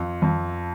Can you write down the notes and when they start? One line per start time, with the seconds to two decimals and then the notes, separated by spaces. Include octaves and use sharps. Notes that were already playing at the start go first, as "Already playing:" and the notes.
Already playing: F2
0.22 F2